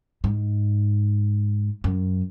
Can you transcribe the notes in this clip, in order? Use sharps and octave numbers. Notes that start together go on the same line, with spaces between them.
G#2
F#2